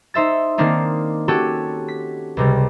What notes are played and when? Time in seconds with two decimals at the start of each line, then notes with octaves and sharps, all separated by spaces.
0.14 D#4 C5 E5 A6
0.58 D#3 A#3 C4 D4 D#4
1.28 C#4 F#4 G4 A4
1.88 B6
2.37 C#2 C3 G3